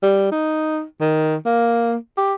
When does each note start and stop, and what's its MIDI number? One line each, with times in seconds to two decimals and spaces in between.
0.03 0.28 55
0.31 0.84 63
1.00 1.36 51
1.46 1.95 58
2.17 2.34 67